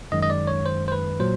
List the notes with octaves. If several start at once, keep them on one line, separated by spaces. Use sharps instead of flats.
F#2 D#3 G#3 D#5
D#5
D5
C#5
C5
C5
B4
A#2 F#3 C5